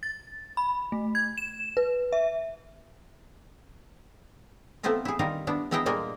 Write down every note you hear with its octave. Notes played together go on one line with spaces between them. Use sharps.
A6
B5
A3
G#6
E7
B4
E5
A3 B3 C4 E4 F4 A#4
E4 G#4
D#3 G3 F4 A#4 A#5
B3 D4 E4
G#3 B3 E4 G#4 G5 A#5
A#2 G3 G#3 A#3 F4 A#4